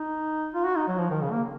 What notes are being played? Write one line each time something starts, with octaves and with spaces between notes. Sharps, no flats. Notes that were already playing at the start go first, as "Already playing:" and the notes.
Already playing: D#4
F4
F#4
D#4
F#3
F3
D#3
C#3
A#3